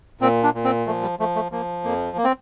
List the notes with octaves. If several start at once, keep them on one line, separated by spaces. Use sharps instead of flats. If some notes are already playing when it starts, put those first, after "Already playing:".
A#2 C4
D4
A#2
C4
F3 A3
G3
F3 A3
A3
F3 A#3
F2 A#3
A#3
C4